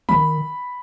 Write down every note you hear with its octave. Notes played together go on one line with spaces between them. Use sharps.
D#3 B5